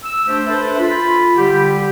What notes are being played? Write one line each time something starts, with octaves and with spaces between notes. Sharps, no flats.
E6
A3 D4 G4 C5
D4 A4 B4 C5 E5
F4 B5
D3 G3 G4